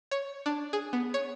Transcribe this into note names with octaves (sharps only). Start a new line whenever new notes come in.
C#5
D4
G#4
B3
C#5